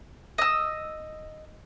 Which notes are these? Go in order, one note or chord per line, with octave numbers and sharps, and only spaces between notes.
D#5 E6